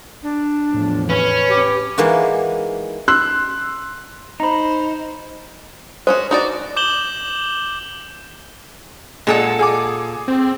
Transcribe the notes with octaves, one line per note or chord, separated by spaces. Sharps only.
D4
E2 A2 F3
C#4 B4
G4
E3 G#3 A#3 D#4 F#4
C6 E6 F#6
D#4 C5 A#5 B5
G#3 C#4 F#4 C5
D#4 F#4 D5
D6 G6 E7 F#7 G7
A#2 G#3 G#4 A4 F#5
G#4 G#5 D6
C4